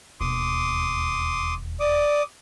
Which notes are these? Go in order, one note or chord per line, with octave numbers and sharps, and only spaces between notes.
E1 D#2 C6 D6 D#6
D5 D6 D#6